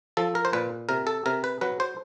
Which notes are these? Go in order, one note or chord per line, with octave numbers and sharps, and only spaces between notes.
F3 A4
A#4
C5
A#2 B4
C3 A#4
A4
C3 A#4
B4
F#3 B4
C5